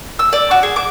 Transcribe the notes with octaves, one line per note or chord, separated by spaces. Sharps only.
E6
D5
F#4
G#4
D6